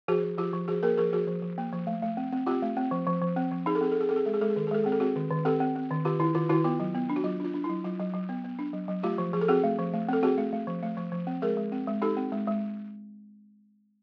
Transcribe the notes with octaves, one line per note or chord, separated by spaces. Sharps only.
F3 F#4 G#4
F3
F3 F4 G4
F3
F3 F#4 G#4
A#3 G#4 A#4
F3 G#4 A#4
F3 F#4 G#4
F3
F3
A#3
F3
A3
A3
C4
C4
C4 F4 G4
A3
C4
F3
F3
F3
C4
F3
D#4 G#4
A4
C4 G#4
A4
C4 G#4
C4 A4
G#4
G#3 A4
G#4
G#3 A4
G#4
D#3 A4
G#4
G#3 A4
C4 G#4
A4
C4 F#4 G#4
D#3
D#3
C4 G4 A4
C4
C4
D#3
D#3 F4 G4
D#3 E4
D#3 F4
D#3 E4 F#4
B3 F4
F#3
B3
D4
F#4
F#3 F4
D4 F4
D4
F#3 E4
F#3 F4
F#3
F#3
B3
B3
D4
F#3
F#3
A3 F4 G4
F3
F3 G#4
A4
C4 F#4 G#4
A3
F3
A3
C4 A4
C4 F#4 G#4
A3
A3
F3
A3
F3
F3
C4
G#3 G#4 A#4
G#3
C4
G#3
D#4 G4 A4
C4
G#3
G#3